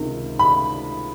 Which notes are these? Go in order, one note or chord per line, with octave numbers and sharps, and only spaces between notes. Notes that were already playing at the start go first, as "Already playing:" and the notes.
Already playing: C#2 C3 D#3
B5